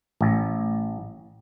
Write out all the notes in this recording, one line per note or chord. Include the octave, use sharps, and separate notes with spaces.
A1